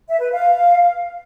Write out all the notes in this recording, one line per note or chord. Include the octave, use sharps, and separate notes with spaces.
E5
B4
F5